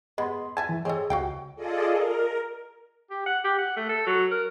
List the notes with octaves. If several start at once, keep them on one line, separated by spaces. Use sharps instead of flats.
G#3 B3 D#5 B5 C6
E5 G#5 A5 G#6 A6
E3
C4 G#4 A4 C#5 D#5
C#2 F#4 F5 G5
F4 G#4 A4 D5 D#5
A#4
G4
F#5
G4
F#5
A3
A4
F#3
A#4